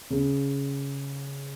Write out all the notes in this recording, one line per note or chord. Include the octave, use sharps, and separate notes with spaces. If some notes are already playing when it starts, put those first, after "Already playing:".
C#3